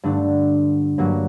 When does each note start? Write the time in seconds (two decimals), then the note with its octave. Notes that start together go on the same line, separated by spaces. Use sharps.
0.03 G2 D3 A3 D4
0.98 G2 F#3 A#3 F#4